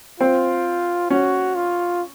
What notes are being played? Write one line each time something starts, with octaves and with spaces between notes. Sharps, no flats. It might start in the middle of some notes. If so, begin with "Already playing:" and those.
C4 F4
C#4 F#4
F4